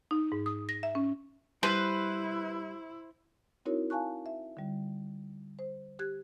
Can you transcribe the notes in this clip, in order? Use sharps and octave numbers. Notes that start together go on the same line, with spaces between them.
D#4
G#2
D#6
A#6
E5
C#4
G3 E4 B4 C5
C4 D#4 E4 F#4 A#4 C#5
F5 G#5 A5 C#6 F#6
E5
D3 G3
C5
G4 F#6 G#6